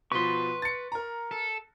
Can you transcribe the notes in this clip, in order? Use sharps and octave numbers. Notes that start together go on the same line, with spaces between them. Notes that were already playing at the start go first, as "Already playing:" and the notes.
B2 F3 B4 C6 C#6
A6 C#7
A#4 A#5
A4